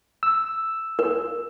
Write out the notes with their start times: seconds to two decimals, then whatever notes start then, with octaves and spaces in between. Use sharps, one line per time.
0.23 E6
0.99 A#4